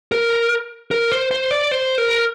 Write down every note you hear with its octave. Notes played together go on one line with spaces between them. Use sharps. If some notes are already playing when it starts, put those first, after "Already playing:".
A#4
A#4
C5
C5
D5
C5
A#4